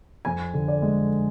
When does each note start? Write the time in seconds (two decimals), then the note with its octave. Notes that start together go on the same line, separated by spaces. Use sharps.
0.25 F2 G#5
0.54 D3
0.68 D5
0.82 G#3